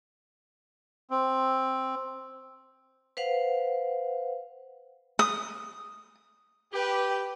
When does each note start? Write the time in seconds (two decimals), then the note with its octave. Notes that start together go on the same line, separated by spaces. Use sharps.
1.10 C4
3.17 B4 C5 F5 F#5
5.19 D#6
6.73 G4 B4